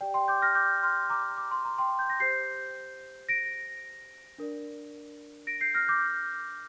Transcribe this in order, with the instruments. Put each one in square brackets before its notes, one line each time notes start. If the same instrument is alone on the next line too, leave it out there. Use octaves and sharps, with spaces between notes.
[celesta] G4 D5 G5
G5 C6
D6 G6
F6 A#6
D6 G6
C6 F6
A#5 D6
D6
C6
A#5
G5 C6
G6
A#6
G4 C5 G6 C7
A#6 D7
D4 A#4 D5
A#6 D7
G6 C7
F6 A#6
D6 G6